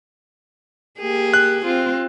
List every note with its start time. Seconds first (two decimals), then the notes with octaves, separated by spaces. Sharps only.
0.99 A#3 G4 G#4
1.34 F#6
1.65 C4 F4